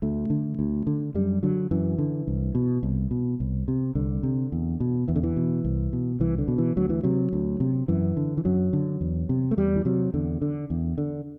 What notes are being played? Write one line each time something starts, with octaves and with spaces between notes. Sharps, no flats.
D2 A3
D3
D2
D3
F#2 G3
D3 F#3
F#2 E3
D3
C2
B2
C2
B2
C2
C3
C2 D3
C3
E2
B2
E2 E3
D3
E3
B2
C2
B2
C2 E3
D3
B2
E3
D2 F#3
E3
C3 F#3
D2
C3
F#2 E3
D3
E3
F#2 F#3
D3
E2
C3
A3
E2 G3
E3
C3 F#3
E2 D3
D3
E2
D3